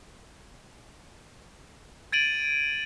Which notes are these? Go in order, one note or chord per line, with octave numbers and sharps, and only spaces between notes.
G#6 A6 D7 D#7 F#7